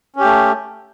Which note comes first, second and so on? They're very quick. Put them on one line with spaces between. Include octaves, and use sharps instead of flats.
C#4 G4 A3